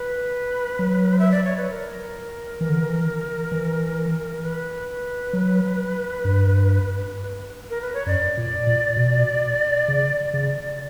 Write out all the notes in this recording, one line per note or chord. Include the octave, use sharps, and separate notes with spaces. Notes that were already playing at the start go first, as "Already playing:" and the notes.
Already playing: B4
F#3
E5
D5
C#5
B4
A#4
E3
D3
E3
E3
B4
F#3
G2
A#4
B4
C#5
F#2 D5
A#2
A#2
B2
C#3
C#3